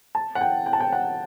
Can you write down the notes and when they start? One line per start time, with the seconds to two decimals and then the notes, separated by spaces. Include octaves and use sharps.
0.15 A5
0.35 F#5
0.41 G5
0.66 G5
0.73 A5
0.80 G5
0.93 F#5